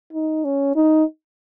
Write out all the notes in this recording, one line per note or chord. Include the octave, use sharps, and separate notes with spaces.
D#4
C#4
D#4